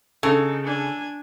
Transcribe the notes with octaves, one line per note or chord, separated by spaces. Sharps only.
C#3 D#4 A4
D4 G#5